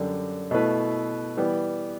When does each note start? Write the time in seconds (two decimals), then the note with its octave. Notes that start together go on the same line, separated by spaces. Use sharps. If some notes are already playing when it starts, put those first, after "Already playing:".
Already playing: F#2 D3 G3 D4
0.51 B2 A3 E4 B4
1.37 E3 G3 B3